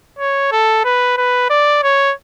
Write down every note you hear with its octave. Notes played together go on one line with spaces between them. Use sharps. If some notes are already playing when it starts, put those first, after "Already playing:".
C#5
A4
B4
B4
D5
C#5